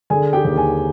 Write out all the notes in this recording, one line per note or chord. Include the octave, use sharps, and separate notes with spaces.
D3 G#4 G#5
G4 G5
D#2
G#4 G#5